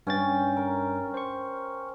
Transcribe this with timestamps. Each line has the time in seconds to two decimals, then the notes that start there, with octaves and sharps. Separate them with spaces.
0.07 G2 C#4 G5 A6
0.57 A#4
1.14 C5 C#6